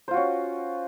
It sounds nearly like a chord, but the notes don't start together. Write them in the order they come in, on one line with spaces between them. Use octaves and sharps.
C5 F4 F#4 C#4